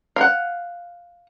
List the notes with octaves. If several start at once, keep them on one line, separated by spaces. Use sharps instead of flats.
F5 F#5